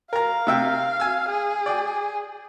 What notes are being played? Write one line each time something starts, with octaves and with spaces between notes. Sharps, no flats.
A#4 F5 A#5
C3 E5 G5
G#5 E6
G#4
D5 G5